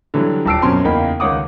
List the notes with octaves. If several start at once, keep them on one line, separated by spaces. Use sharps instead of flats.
D3 E3 F#3 G3
D#1 G5 A5 E6 C7 D7
B1 F#2 B2 C4 C#4 C6
E2 C#3 A#3 D#4 G5 B5
C#2 D#3 C#5 F#5 D6 D#6